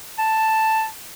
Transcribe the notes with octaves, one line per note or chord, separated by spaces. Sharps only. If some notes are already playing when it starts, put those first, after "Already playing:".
A5